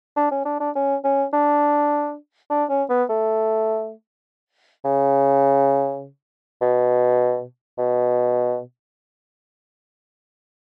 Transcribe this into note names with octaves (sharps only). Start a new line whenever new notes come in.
D4
C#4
D4
D4
C#4
C#4
D4
D4
C#4
B3
A3
C#3
B2
B2